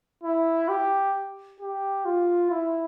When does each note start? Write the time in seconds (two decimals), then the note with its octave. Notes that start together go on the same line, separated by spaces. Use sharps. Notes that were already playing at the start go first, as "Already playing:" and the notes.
0.23 E4
0.69 G4
1.60 G4
2.05 F4
2.51 E4